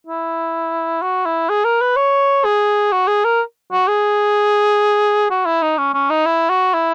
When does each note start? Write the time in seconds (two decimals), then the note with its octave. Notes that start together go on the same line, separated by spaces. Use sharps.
0.07 E4
1.02 F#4
1.26 E4
1.49 G#4
1.64 A#4
1.81 B4
1.96 C#5
2.45 G#4
2.92 F#4
3.07 G#4
3.24 A#4
3.72 F#4
3.88 G#4
5.30 F#4
5.46 E4
5.62 D#4
5.78 C#4
5.94 C#4
6.10 D#4
6.26 E4
6.50 F#4
6.74 E4